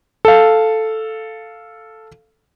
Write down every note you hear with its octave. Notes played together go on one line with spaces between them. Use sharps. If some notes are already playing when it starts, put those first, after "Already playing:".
A4 F5